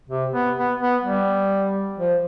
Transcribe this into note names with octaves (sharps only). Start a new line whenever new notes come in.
C3
B3
B3
B3
G3
F3